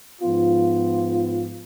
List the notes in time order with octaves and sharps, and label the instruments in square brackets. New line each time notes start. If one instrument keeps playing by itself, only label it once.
[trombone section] G#2 F3 B3 F4